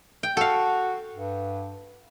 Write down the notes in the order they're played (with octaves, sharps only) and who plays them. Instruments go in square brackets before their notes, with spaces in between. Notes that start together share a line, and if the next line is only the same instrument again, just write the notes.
[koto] G5
[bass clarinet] F#4 [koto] A4 F5
[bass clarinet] G2